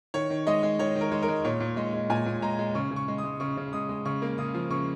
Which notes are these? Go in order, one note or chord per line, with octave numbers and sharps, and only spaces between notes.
D#3 C#5
D#3
G#3 D#5
G#3
D#3 C#5
D#3
A#4
G#3
A#4
G#3
A#2 C#5
A#2
G#3
G#3
A#2 G#5
A#2
G#3 A#5
G#3
C#3 C#6
C#3
C#6
G#3
D#6
G#3
C#3 C#6
C#3
G#3 D#6
G#3
C#3 C#6
A#3
C#3 D#6
F3
C#3 C#6